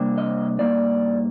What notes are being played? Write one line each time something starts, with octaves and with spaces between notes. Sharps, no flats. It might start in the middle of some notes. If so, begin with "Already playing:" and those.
Already playing: C3 G3 A#3 D4
D#5
G2 F3 A#3 D#4 D5